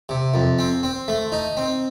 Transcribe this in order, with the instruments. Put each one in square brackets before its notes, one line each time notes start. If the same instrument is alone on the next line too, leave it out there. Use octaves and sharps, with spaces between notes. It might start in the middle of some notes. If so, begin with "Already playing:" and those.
[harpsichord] C3
F2
C4
C4
A3
D#4
C4